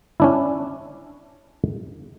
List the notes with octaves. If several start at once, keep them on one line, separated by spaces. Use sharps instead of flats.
C#4 D4 E4